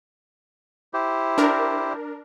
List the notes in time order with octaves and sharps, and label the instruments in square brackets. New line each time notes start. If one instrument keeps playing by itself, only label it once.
[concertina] E4 G4 C5
[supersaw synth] D4 A#4